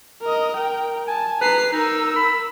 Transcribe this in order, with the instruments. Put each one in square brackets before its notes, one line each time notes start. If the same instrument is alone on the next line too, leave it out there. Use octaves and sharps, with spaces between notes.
[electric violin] A#4 D#5
A#4 G5
[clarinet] G#5 [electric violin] A5
[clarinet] B4 [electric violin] A#5 C7
[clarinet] D#4 [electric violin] A#4 E6
[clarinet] B5